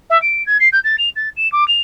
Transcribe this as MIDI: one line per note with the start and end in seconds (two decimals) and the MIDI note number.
0.10 0.20 76
0.22 0.45 98
0.46 0.57 92
0.60 0.69 96
0.72 0.79 91
0.84 0.96 93
0.98 1.09 101
1.16 1.29 93
1.37 1.50 100
1.52 1.67 86
1.68 1.82 101